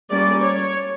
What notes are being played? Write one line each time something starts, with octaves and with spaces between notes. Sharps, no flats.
G3 A#3 C#4 D5
C#5